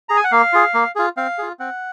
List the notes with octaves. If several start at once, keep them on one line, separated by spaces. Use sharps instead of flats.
G#4 A#5
G#5
F#5
A#3 F5
F4 G#4
A#3
F4 G#4
C4 F5
F4 G#4
C4 F#5